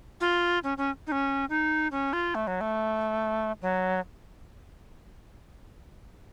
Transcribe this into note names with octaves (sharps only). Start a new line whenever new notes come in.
F4
C#4
C#4
D#4
C#4
D#4
C#4
F4
A3
F#3
A3
F#3